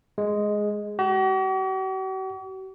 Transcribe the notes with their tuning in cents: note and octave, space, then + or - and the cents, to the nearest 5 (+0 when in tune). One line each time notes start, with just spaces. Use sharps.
G#3 +0
F#4 +45